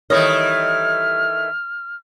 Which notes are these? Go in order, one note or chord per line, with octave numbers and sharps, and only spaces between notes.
D#3 E3 G3 A3 C#5 D#5 F6